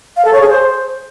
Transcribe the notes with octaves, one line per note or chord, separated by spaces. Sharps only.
F5
A4
C#5
G#4
C5